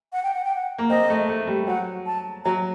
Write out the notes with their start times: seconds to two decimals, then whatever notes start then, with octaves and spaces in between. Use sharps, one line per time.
0.13 F#5
0.23 G5
0.34 F#5
0.44 G5
0.55 F#5
0.78 A#3
0.90 C4 D#5
1.10 A3
1.29 A3
1.47 G3
1.67 F#3 F#5
2.06 A5
2.45 F#3 A#5